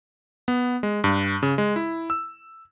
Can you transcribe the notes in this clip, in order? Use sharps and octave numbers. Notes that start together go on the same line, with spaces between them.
B3
G#3
G2
C#3
G#3
E4
E6